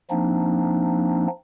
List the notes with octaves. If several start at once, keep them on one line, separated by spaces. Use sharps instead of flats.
F3 A#3 C4 D4 D#4